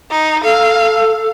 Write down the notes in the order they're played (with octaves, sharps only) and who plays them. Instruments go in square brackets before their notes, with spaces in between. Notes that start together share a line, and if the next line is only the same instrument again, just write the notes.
[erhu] D#4
[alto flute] A4 [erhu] F5